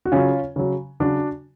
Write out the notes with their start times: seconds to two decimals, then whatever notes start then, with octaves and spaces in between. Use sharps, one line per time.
0.05 F#4
0.12 C#3 F#3 C#4 F4
0.56 C#3 F#3
1.00 C#3 F#3 D4 F#4